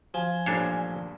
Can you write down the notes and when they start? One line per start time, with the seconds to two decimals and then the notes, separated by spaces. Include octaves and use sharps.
0.14 F3 G#5
0.46 A1 G2 A#2 D4 C5 C#5